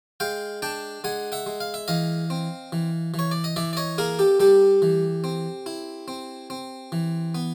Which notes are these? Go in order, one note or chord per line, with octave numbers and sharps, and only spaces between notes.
G#3 F5 G5
D4 G5 A5
G#3 F#5 G#5
E5 F#5
G#3
F5
E5
E3 D#5 F5
C4
E3
E3
C#5
D5
D#5
E3 D5 E5
D5
C#5 D#5
A#3 G#4 A#4
G4 A4
G3 G4 A4
E3
C4
E4
C4
C4
E3
B3